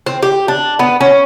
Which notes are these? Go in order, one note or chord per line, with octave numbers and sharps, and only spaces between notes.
C4
G4
D4
B3
C#4